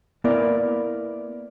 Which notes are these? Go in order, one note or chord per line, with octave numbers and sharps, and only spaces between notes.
A#3 B3 E4 A#4 D5